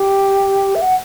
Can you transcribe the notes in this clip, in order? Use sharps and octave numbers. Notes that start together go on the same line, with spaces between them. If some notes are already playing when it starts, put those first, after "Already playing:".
Already playing: G4
E5
F#5